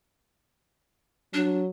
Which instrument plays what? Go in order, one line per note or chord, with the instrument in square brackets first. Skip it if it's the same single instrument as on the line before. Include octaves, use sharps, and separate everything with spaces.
[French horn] F#3 [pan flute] D4